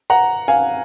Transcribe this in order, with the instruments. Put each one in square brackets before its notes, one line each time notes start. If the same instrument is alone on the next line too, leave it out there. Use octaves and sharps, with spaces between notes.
[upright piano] F#5 A#5
F5 G#5